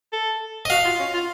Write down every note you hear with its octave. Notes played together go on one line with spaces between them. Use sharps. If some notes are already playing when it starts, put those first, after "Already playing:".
A4
D#5
F#4 F5
F4
C#4
F4